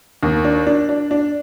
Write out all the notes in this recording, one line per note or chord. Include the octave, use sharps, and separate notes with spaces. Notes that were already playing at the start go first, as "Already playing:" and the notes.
D#2
D4
D4
D4
D4